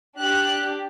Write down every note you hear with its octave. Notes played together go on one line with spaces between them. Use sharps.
D4 G4 F#6